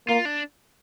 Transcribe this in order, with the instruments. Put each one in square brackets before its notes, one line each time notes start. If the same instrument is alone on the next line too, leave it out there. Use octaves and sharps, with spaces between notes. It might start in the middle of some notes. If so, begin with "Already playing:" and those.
[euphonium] A#3 [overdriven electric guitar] F4
[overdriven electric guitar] D4